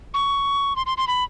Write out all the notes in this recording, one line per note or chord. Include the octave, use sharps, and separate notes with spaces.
C#6
C6
C6
C6
B5